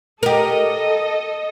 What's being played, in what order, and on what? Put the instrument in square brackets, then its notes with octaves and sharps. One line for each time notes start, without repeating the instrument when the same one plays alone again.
[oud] G4 A#4 [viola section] A4 D#5